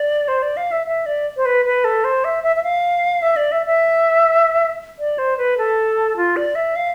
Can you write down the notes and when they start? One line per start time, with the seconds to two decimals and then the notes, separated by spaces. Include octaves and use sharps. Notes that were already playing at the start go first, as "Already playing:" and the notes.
Already playing: D5
0.28 C5
0.43 D5
0.57 F5
0.72 E5
0.87 E5
1.06 D5
1.37 C5
1.45 B4
1.65 B4
1.84 A4
2.04 C5
2.24 E5
2.43 E5
2.56 E5
2.63 F5
3.22 E5
3.36 D5
3.52 E5
3.67 E5
4.99 D5
5.18 C5
5.38 B4
5.58 A4
6.17 F4
6.36 D5
6.55 E5
6.76 F5